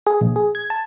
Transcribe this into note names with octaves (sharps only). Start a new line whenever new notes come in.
G#4
A#1
G#4
G#6
A5